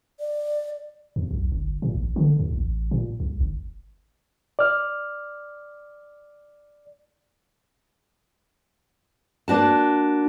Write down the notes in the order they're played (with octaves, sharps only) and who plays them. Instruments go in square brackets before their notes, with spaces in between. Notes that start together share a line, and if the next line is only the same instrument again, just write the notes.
[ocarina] D5
[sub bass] E2
B1
G1
A#2
A1
D3
D#2
A1
A#2
C2
G1
[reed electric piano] D5 F6
[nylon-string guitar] A#3 D4 F#4 A5